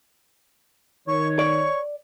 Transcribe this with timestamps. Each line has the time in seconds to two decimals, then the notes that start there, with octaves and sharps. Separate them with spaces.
1.08 D#3 C#5 C#6
1.39 D5 C#6